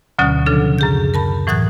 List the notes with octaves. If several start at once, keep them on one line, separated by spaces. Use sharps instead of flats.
D2 B2 D3 F#3 C#4
C#3 F3 D4 A4
F#2 G#4 G6
A#4 A5 B5
A2 E3 F#3 D#6 F#6 G#6